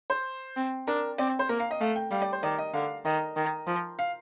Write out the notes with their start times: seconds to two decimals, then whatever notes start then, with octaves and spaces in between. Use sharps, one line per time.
0.10 C5
0.56 C4
0.87 D4 A#4
1.18 C4 D5
1.39 C5
1.49 A#3 A#4
1.60 F5
1.71 D#5
1.80 A3 F5
1.96 G5
2.11 G3 F5
2.22 D5
2.33 C5
2.43 D#3 D5
2.58 D#5
2.74 D3 F5
3.05 D#3 D#5
3.36 D#3
3.67 F3
3.99 F5